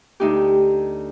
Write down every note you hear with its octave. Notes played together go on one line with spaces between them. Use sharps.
D2 D#4 G4